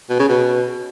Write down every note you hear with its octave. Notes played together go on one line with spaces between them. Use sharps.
B2
C#3
B2